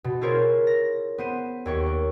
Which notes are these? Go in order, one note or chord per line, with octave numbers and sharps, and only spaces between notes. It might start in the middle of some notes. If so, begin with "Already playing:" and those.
B2
E4 F4 G#4 A#4 C5 C#5
A#6
B3 C5 D#7
D#2 C#5 C#6
A#3